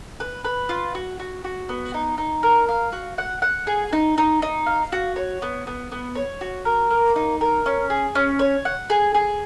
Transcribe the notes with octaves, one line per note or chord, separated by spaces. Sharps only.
B4
B4
F4
F#4
F#4
F#4
B3
D#4
D#4
A#4
F5
F#4
F#5
F#5
G#4
D#4
D#4
D#4
F5
F#4
C#5
B3
B3
B3
C#5
F#4
A#4
A#3
D#4
A#4
C#4
G#4
C#4
C#5
F#5
G#4
G#4